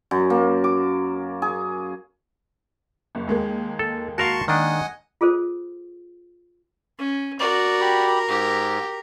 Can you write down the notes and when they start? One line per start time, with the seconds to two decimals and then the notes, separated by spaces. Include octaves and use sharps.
0.11 F#2
0.30 A#3
0.64 D6
1.42 G#4
3.15 F#1
3.27 D#2 G#3 A#3
3.79 A4
4.18 F#4 A#4 F5 A5 C6 C#6
4.48 D#3 D4 D#5 F#5 G#5
5.21 F4 G#4 A4 C5
6.98 C#4
7.39 F#4 A#4 D5
7.81 G4 B5
8.28 G#2 G4